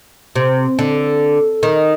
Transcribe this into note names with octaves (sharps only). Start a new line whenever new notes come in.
C3
D3
D#3